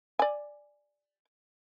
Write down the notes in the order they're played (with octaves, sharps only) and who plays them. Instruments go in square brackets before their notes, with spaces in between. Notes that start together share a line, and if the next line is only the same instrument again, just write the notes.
[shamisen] D5 G#5